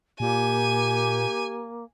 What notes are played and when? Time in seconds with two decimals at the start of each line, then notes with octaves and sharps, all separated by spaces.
0.20 A#2 A#3 G4 G#5